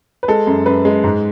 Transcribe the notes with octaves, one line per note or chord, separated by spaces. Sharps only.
B4
G#3 A4
F#2
F#2 B4
G#3
G#2